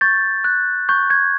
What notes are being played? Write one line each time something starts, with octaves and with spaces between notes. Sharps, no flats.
C#6 G6 A6
F#6
C#6 G6
G#6